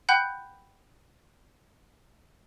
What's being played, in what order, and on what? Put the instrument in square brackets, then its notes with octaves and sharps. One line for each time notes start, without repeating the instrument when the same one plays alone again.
[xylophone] F#5 G5 B5 F#6 G6